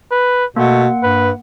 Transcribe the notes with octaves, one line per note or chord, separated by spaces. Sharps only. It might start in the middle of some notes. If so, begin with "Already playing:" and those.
B4
B2 A3 A#3 F#5
G2 B4